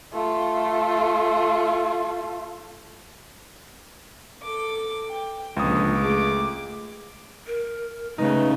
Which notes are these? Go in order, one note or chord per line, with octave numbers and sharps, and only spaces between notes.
A3 F4
A4 D6
G5
C#2 A#2 D3 F3 D#6
A3 G#4 D6
A#4
C#3 A3 D#4 B4